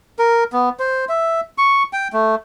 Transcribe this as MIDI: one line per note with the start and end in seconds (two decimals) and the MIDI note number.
0.19 0.44 70
0.53 0.69 59
0.79 1.05 72
1.09 1.41 76
1.58 1.83 85
1.93 2.08 79
2.13 2.35 57